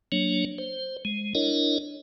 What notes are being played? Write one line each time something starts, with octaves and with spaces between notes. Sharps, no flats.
F#3 A#3 D4 C#5
C5
G#3
D4 E4 A#4 C#5 D#5